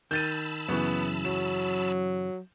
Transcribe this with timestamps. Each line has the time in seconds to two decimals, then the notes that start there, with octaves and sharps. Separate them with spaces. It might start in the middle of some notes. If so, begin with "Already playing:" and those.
0.11 D#3 A5 B5 E6 G6 A6 D#7
0.69 F#2 C#3 E3 B3
1.25 F#3 E7